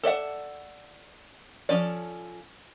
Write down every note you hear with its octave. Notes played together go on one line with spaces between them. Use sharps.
A4 D5 E5 F#5
F3 C#4 A4 D5